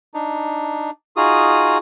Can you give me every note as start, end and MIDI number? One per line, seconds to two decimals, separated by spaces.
0.14 0.90 62
0.14 0.90 63
1.17 1.78 63
1.17 1.78 65
1.17 1.78 66
1.17 1.78 68
1.17 1.78 87